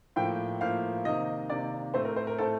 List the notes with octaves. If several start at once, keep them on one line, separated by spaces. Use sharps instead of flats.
A2 F3 A#3 G5
A2 F3 A#3 F5
C3 D#3 A#3 D#5
C3 D#3 A#3 D5
A2 A3 C4 C5
A#4
C5
A#4
A2 A3 C4 A4